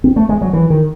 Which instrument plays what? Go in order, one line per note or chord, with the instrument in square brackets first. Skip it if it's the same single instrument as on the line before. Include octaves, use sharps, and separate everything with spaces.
[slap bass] C4
A3
G#3
F#3
E3
D#3